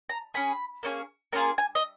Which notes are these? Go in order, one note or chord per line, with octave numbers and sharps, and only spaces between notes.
A#5
C#4 G#4 B5
A#3 C#4 F4 G#4
A#3 C#4 F4 G#4 A#5
G#5
D#5